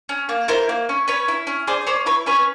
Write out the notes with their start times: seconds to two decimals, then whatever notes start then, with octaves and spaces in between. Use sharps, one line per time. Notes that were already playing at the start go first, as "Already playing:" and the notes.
0.09 C#4
0.29 A#3
0.48 E4 A#4 C5
0.69 A#3
0.89 C#4
1.08 C#4 B4 C#5
1.28 E4
1.47 C#4
1.67 G#4 C5 D5
1.87 C#4 C5 D5
2.06 E4 B4 C#5
2.26 C#4 B4 C#5